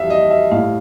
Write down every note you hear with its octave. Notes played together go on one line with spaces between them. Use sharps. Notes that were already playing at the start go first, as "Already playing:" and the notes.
Already playing: F2 E3 G3 E5 F5
G3 D#5
E5
A2 F5